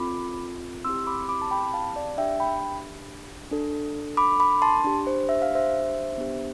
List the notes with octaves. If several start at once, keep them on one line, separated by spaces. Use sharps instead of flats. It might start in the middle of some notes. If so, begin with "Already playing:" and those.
Already playing: C4 F4 A4 B5 D6
C4 E4 G4 C6 E6
B5 D6
B5 D6
A5
G5 B5
F5 A5
D5 F5
D4 G4 E5 G5
G5 B5
D4 A4
B5 D6
B5 D6
A5 C6
D4 G4
C5
E5
F5
C5 E5
B3 D4 G4